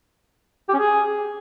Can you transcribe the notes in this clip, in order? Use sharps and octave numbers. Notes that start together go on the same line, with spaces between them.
G4
C#4
G#4